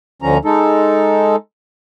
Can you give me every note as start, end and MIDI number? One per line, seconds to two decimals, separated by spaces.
0.22 0.38 38
0.22 0.38 50
0.22 0.38 53
0.22 0.38 61
0.22 0.38 82
0.45 1.36 56
0.45 1.36 63
0.45 1.36 69